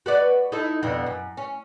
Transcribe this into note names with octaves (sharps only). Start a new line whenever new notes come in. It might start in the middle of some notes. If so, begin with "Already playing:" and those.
F#4 B4 D5
D#4 E4 A4
F2 B2 D3
F#2
C#4